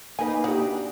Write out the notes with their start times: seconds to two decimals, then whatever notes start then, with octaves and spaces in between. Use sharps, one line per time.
0.19 A#3 D#4 B4 G#5
0.44 D4 D#4 F#4 G4